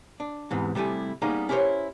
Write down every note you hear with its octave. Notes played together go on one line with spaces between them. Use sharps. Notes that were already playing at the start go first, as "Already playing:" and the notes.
D4
E2 G#2 C3 E3
C3 G3 A3 E4 G#5
G3 A#3 B3 C#4 D#4 G#4
C#4 E4 G4 A#4 C5 C#5